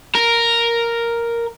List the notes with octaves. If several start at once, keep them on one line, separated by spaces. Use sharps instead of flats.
A#4